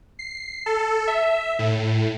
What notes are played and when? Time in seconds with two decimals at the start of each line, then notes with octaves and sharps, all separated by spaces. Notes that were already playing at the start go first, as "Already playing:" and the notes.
0.19 C7
0.66 A4
1.07 E5
1.59 A2